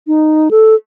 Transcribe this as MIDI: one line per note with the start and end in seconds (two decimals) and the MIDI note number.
0.07 0.49 63
0.51 0.75 69